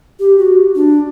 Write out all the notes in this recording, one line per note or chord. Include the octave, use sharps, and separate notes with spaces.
G4
F#4
D4